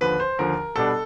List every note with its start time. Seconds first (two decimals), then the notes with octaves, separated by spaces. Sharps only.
0.01 D#2 D3 F3 B4
0.20 C5
0.38 D#2 D3 F3 A#4
0.76 B2 G3 B3 D4 A4